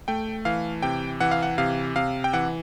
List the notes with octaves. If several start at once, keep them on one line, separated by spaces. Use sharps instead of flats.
A3 G5
E3 F5
C3 G5
E3 F#5
F5
F#5
C3 F5
C3 F5
G5
E3 F#5